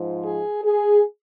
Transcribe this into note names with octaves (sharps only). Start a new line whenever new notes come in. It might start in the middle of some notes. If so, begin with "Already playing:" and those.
Already playing: G#2 F3
G#4
G#4